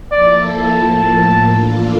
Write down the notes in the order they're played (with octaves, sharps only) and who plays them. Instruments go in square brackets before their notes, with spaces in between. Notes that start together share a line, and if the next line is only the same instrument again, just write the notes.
[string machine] F3 A#3 E4 A4 [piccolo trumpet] D5
[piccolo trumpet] A5
[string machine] A2 F3 A#3
E3 A#3 D4 F4 A4